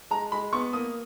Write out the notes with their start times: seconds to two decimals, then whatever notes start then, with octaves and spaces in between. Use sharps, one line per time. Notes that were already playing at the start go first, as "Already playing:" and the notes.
0.11 G#3 A#5
0.32 G#3 B5
0.53 B3 C#6
0.73 A#3 D#6